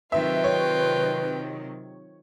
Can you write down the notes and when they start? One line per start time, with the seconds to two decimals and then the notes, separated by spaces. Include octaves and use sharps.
0.12 C3 D#3 F#3 F4 B4 E5 G5
0.44 C#5